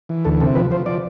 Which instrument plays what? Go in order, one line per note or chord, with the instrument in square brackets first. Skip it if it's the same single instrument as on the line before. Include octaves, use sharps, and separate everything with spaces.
[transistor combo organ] E3
D2 A4
C3 A4
F3 B4
F3 C5
F3 D5